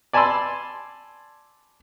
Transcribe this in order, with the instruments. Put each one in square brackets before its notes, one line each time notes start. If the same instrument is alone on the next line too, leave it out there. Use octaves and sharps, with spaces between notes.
[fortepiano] D5 G#5 A5 B5 C6 E6